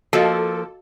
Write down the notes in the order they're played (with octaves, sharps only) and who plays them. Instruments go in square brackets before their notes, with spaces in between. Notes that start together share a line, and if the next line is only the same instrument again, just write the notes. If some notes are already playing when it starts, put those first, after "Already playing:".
[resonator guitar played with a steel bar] F3 A#3 [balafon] F#4 D#5 F5 [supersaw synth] A4